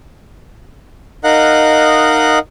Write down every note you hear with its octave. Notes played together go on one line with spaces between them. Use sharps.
D#4 A#4 D#5 F5 F#5 F#6